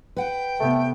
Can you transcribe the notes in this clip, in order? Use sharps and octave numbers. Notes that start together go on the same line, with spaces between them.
B4 F#5 G5
C3 A3 B3